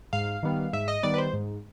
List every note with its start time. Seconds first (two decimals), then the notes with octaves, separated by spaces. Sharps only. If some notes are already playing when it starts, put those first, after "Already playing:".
0.13 G#2 F5
0.43 D#3 G3 B3
0.73 G#2 E5
0.88 D#5
1.03 D#3 G3 B3 D5
1.14 B4
1.18 C5
1.33 G#2